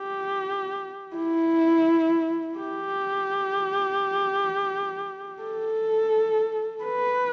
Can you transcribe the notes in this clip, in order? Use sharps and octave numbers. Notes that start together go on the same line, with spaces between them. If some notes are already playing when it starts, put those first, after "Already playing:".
Already playing: G4
E4
G4
A4
B4